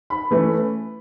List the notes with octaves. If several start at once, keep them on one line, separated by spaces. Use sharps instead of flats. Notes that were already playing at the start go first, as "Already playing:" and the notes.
B5
E3 A3 C#4